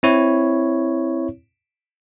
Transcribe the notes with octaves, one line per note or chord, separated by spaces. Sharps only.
C4 E4 C#5